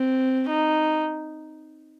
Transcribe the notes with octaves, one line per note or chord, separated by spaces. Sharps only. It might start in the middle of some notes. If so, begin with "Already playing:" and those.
Already playing: C4
D#4